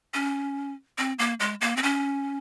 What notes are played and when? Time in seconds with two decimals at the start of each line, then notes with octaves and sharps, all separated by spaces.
0.14 C#4
0.98 C4
1.19 A#3
1.40 G#3
1.61 A#3
1.76 C4
1.83 C#4